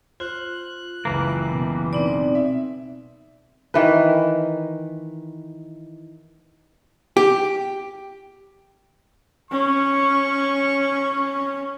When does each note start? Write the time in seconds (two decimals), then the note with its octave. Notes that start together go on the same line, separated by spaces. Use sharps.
0.20 F4 C5 F#6
1.05 F#1 C#2 E3 A#3
1.51 B2
1.93 B2 C4 D#4 D5
2.35 E5
3.74 D#3 E3 B4
7.17 G4
9.51 C#4 C#6